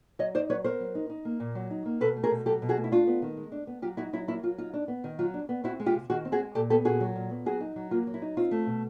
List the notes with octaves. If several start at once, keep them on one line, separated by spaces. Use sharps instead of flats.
F#3 C#5 D#5
D#4 C5 D5
F#3 B4 C#5
B3 A#4 C5
F#3
D#4
D#4
A#3
A#2
F#3
D#4
A#3
B2 A4 B4
A3
G#4 A#4
B2
F#3 G4 A4
B2
F#4 G#4
A3
E4
D4 F4
B3
D#3
G#3
D4
B3
F#3 F4 G4
D#4 E4 F#4
F#3 E4
A#3 E4
F#3 F4
D#4 F4
D4
B3
D#3
F#3 F4
D4
B3
C4 E4 F#4
G#3
F4 G4
C3
D#3 F#4 G#4
C4
F#4 G#4
G#3
A#2 G4 A4
B3 G4 A4
A#2 F#4 G#4
F#3
A#2
B3
F#3 F#4 G#4
D#4
F#3
A#3 F4
F#3
E4
D#4
C4 F4
A3
B2